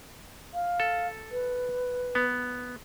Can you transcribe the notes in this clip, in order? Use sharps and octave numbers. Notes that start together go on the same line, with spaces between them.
F5
A4
B4
B3